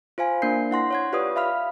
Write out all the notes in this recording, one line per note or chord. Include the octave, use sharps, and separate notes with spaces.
F4 C5 F5 G#5
A#3 D4 A#4 G6 C7
E4 F#5 C6 A#6
C#5 F#5 G#6
F4 G4 B4 C#5 D5 D#6
E5 F5 B5 F6